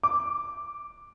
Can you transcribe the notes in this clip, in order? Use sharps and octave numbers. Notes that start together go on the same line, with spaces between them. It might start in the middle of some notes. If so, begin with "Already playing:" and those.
D6